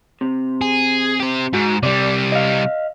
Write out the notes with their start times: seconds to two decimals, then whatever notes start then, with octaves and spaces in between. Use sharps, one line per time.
0.21 C3
0.61 G#4
1.20 G4 C5
1.54 G#2 F#4
1.83 C3 G3 D5
2.32 D#5 F5